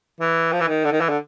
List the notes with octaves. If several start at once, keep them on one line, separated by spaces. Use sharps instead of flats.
E3
F3
E3
D#3
D3
D#3
E3
D3